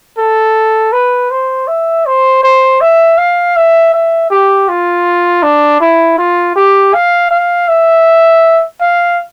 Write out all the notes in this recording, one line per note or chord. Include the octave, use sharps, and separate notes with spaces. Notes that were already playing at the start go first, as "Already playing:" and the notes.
A4
B4
C5
E5
C5
C5
E5
F5
E5
E5
G4
F4
D4
E4
F4
G4
F5
F5
E5
F5